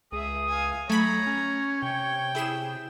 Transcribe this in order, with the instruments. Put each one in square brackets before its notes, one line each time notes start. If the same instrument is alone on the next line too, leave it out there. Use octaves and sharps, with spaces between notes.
[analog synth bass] C#2 [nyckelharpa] G#4 E5 [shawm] D#6
[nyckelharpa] F5 G#5
[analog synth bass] F#3 [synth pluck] A3 B5 [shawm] C#5 [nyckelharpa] A#5
[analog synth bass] C#4
[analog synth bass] C3 [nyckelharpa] G5
[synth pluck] E4 G#4 E7